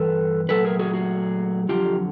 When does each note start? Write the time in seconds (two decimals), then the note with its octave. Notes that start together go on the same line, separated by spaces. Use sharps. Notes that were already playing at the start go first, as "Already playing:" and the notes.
Already playing: G2 E3 A4 B4
0.49 A#2 F#3 A3 A4 B4
0.65 G#4 A#4
0.79 F#4 G#4
0.94 F#4 G#4
1.69 F2 D3 F#3 F4 G4